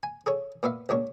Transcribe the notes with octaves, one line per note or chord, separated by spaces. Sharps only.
G#5
G#4 A4 C#5
A#2 B3 E5 F5
C#2 A#2 D4 C#5